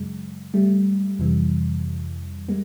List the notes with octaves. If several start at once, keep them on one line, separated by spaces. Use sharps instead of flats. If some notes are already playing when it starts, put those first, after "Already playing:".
Already playing: F#2 C#3 F#3 G#3
G3 A3
F2 C3 E3 G3
G3 G#3 A#3